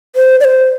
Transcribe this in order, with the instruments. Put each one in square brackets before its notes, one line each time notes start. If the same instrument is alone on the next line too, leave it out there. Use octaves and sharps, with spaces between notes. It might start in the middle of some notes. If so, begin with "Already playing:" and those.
[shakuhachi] C5
D5
C5